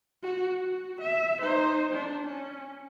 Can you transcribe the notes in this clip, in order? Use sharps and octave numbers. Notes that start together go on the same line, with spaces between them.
F#4
F#4
E5
D#4 C5
D4
C#4